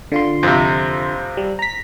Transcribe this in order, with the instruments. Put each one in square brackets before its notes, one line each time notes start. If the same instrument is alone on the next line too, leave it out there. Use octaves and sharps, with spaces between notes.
[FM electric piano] D3 F4 C6
[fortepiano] F2 C3
[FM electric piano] G3
A#5 B6